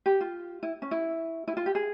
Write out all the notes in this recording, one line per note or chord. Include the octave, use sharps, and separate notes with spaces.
G4
F4
E4
C#4
E4
E4
F4
G4
G#4